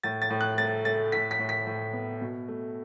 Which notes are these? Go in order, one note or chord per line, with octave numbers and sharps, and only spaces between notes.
A2 A6
A6
A2
F#6
A3 A6
A3 A6
A2 B6
B6
A2
B6
A2
B3
B2
A3